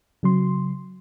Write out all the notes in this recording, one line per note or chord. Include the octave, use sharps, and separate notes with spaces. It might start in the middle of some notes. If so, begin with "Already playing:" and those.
C#3 F#3 C6